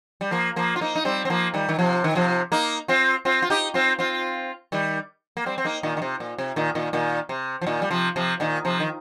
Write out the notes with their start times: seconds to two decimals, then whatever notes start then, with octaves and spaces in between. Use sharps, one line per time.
0.21 G3
0.31 F3 A#3
0.56 F3 A#3
0.76 F4
0.81 A#3 D#4
0.95 D#4
1.05 G3 C4
1.25 C4
1.30 F3 A#3
1.54 D#3 G3
1.69 D#3
1.79 C3 F3
2.04 D#3
2.15 C3 F3
2.52 A#3 D#4
2.88 C4 F4
3.25 C4 F4
3.42 F4
3.50 D#4 G4
3.74 C4 F4
3.99 C4 F4
4.72 D#3 G3
5.37 A#3
5.46 G3 C4
5.58 C4
5.65 A#3 D#4
5.83 A#2 D#3
5.97 D#3
6.02 C3
6.20 A#2
6.38 C3
6.56 A#2 D#3
6.75 A#2 D#3
6.93 A#2 D#3
7.29 C3
7.62 F3
7.66 A#2 D#3
7.82 G3
7.90 C3 F3
8.16 C3 F3
8.40 A#2 D#3
8.65 C3 F3
8.80 D#3